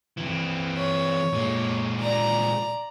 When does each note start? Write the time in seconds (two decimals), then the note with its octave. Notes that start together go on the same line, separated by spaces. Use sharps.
0.18 E3 C4
0.77 C#5
1.33 A#2 G#3
2.00 D5 A#5